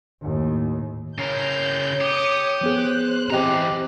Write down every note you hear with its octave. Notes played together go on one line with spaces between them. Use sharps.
D#2 A2
C#3 A#4 C#5 G6
G4 D#6 C#7
F3 B3 G#4 C5 F#6
E3 C4 G4 D#5 G5 A#5